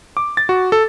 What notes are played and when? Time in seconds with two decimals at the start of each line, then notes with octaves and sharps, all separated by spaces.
0.17 D6
0.37 A6
0.49 F#4
0.72 A4